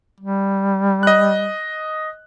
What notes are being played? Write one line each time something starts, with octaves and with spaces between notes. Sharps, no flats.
G3
D#5 F#6